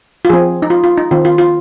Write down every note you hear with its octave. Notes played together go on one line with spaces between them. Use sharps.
F4
F3 C4 G#4
D#4
F4
F4
D#4
D#3 C4 F4
F4
F4